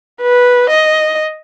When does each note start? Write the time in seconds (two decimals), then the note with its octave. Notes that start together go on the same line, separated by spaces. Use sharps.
0.21 B4
0.70 D#5